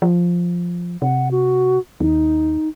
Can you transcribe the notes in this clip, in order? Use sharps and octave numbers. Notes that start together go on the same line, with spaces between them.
F3
C3 F#5
F#4
D#2 D#4